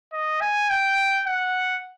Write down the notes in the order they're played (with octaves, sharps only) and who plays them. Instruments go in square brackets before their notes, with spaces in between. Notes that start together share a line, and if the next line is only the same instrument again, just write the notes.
[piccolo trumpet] D#5
G#5
G5
F#5